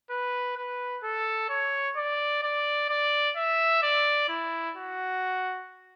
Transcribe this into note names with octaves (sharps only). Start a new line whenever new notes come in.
B4
B4
A4
C#5
D5
D5
D5
E5
D5
E4
F#4